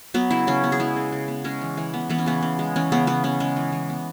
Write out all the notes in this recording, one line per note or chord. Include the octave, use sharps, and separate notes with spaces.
F#3 B3
C#3 E4
C#3 C#4
B3
G#4
G#3 E4
C#3
C#3
B3
G#3 C#4
E3
E3
B3
E3 B3
C#4
C#3 B3
C#3
G#3
E3 C#4
C#3 B3
C#3 B3
B3 C#4
G#3 C#4
E3
E3
B3